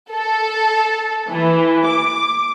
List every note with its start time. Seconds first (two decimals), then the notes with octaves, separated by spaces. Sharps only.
0.11 A4
1.29 E3
1.86 D6